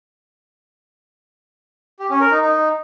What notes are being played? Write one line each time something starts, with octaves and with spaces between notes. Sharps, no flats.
G4
C#4
A#4
D#4
D#4